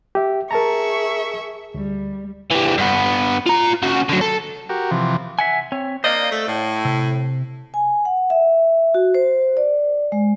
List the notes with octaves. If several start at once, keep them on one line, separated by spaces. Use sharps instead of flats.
G4 E5
G#4 A#4 E5 A5 A#5 C#6
D2 G3
E3 G3
G2 B3
F4 A#5
C#3 F#4
D3 F#3
A4
F#4 G4 A#4
C3 E3 F3
E5 F#5 G#5
C4 C#5
A#3 D4 C5 D5 D#5 F5
A3
A2
C3
G#5
F#5
E5
F#4
C5
D5
G#3